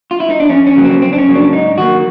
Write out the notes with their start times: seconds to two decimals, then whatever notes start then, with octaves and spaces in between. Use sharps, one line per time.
0.11 F4
0.20 E4
0.30 D#4
0.40 D4
0.49 F2 C#4
0.67 C#4
0.75 C#3 F#3 A#3
0.84 C4
1.02 F2 C4
1.13 D4
1.18 C#4
1.27 C#3 F#3 A#3
1.36 D4
1.52 G#2 D#4
1.78 D#3 F#3 A#3 F#4